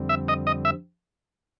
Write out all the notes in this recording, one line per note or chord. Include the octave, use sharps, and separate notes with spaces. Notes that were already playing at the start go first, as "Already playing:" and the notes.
Already playing: F2 D3 G3 C4
E5
D#5
D#5
E5